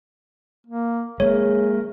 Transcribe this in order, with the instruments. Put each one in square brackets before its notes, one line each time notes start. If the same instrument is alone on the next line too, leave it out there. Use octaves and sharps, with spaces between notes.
[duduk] A#3
[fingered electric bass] G#3 A#3 [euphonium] G#4 [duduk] A#4 [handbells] C#5